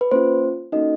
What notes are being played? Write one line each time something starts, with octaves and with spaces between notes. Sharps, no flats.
B4
A#3 C#4 F4 C5
A#3 C#4 D#4 F#4 A4 D#5